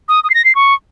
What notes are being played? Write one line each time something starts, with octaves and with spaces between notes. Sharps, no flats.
D#6
D#6
C7
A#6
C7
C#6